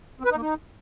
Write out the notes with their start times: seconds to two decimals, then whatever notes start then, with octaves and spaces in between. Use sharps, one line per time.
0.20 C4
0.25 B4
0.31 D#4
0.36 A#3
0.42 D#4